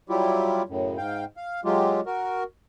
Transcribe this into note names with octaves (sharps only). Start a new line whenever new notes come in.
F#3 G3 E4 F4 G4
F#2 A2 C#3
G#2 F5 G5
F5
F#3 G#3 F4 G4
F#4 A#4